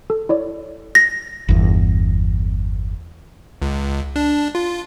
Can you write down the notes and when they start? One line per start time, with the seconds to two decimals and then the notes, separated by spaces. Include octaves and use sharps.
0.10 A4
0.29 E4 C#5 D5
0.95 A#6
1.48 G1 E2
3.62 C#2
4.16 D4
4.55 F4